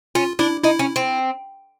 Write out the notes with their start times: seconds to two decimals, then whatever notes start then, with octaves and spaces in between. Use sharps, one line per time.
0.15 C#4 F4
0.39 D4 E4
0.64 D#4 E4
0.79 C#4
0.96 C4